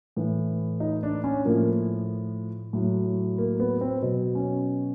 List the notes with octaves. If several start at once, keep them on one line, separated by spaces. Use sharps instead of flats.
A2 E3
D#4
D4
C#4
A2 F3 A#3
A2 F#3
A#3
B3
C4
B2 F#3
C#4